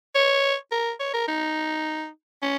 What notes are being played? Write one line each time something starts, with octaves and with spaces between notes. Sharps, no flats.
C#5
A#4
C#5
A#4
D#4
C#4